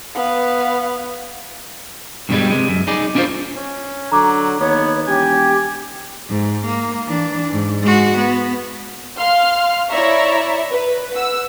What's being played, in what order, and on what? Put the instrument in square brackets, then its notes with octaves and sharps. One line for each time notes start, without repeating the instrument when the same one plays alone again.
[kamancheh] B3 F5
[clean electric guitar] G2 B2 D3 F3 G3 G#3
C3 G#3
F#2
D#4 G#4 D5
C#4 D4 F4 B4 C5
[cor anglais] C#4
[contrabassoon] D3 [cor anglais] F#3 [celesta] A#5 D6
[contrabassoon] D#2 [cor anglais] B3 [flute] C#5
[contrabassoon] E1 [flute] G4 [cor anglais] G#5
[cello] G#2
A#3
E3 D4
G#2
G#3 F#4
B3
[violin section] F5 C6 F6
E4 C#5 D5 E5 A#5 C#6
B4
F#5 E6